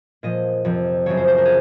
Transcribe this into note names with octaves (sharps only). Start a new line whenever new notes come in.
A#2 F3 D#5
F2 C3 F3
F#2 C#3 F3 C#5
C5
C5
A#4
G#4